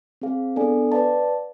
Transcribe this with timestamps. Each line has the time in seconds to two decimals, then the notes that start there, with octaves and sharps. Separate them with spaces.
0.22 C4 G#4 C5 F5
0.56 B3 D4 A4 D5 G#5
0.92 B4 D5 F5 A5